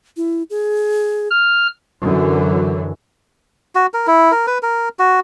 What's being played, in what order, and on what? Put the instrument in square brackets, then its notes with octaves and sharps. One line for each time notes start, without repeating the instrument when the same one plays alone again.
[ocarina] E4
G#4
[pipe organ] F6
[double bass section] F#2 D3 E3 F#3
[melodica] F#4
A#4
E4
A#4
B4
A#4
F#4